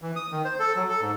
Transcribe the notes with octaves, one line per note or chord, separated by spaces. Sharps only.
E3
D#6
D#3
C5
A4
F#3
A4
G#2